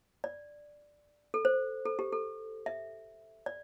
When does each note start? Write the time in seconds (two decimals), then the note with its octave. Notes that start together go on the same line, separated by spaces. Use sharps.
0.24 D5
1.34 A4
1.45 C5
1.85 A4
1.99 G4
2.12 A4
2.66 E5
3.46 D5